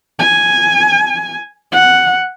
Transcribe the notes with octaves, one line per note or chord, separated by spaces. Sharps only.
G#5
F#5